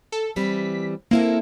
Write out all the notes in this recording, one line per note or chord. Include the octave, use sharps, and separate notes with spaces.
A4
E3 G3 C4 B6
A#3 C4 E4 A4